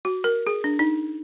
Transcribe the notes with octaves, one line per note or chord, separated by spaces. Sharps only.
F#4
A#4
G#4
D4
D#4